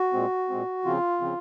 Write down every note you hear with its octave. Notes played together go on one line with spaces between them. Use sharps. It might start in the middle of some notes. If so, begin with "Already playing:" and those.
Already playing: F#4
A#2 G#3 C4
A#2 G#3 C4
C#3 F3 C4 F4
C#3 F3 C4